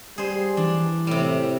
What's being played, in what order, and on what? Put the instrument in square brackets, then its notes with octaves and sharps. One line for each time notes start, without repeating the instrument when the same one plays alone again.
[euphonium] G3 [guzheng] G#4 C5
[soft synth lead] E3 [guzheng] D4
[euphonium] A2 [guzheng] C3 G3